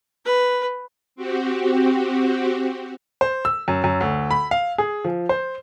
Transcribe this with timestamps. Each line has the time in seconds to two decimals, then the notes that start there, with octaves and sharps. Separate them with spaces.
0.25 B4
1.16 C4 F#4 G4
3.21 C5
3.45 E6
3.68 F#2
3.84 F#2
4.01 D2
4.31 B5
4.51 F5
4.78 G#4
5.04 F3
5.29 C5